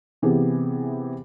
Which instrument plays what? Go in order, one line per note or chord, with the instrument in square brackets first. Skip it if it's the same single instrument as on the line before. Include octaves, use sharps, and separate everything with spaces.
[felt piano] C3 E3 B3 G4 G#4